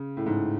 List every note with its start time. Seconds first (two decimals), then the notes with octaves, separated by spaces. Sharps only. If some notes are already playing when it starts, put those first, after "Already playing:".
Already playing: C#3
0.17 A2
0.26 G#2